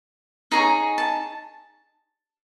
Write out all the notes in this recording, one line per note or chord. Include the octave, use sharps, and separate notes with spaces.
D#4 G#4 C#5 A#5
A5